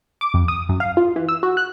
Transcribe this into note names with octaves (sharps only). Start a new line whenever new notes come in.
D6
F2
D#6
F#2
F5
F4
E3
E6
F#4
F#6